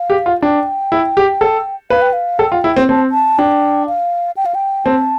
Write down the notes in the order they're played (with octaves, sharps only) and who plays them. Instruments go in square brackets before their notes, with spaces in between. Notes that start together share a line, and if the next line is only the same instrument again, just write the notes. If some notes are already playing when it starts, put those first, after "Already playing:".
Already playing: [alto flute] F5
[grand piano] G4
F4
[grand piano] D4 [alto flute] G5
[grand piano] E4
G4
A4
[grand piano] B4 [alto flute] F5
[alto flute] G5
F5
[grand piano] A4 [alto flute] G5
[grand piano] F4
E4
C4
[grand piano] C4 [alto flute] A5
[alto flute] A5
[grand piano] D4 [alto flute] G5
[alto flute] F5
G5
F5
G5
[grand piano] C4 [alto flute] A5